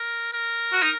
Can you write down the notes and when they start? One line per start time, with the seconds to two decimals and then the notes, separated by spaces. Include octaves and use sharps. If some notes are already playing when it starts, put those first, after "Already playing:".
Already playing: A#4
0.33 A#4
0.72 F#4
0.82 D#4